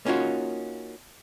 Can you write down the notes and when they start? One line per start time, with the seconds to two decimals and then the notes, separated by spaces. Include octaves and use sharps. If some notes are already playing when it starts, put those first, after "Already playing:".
0.05 A#3 C#4 D#4 F4 F#4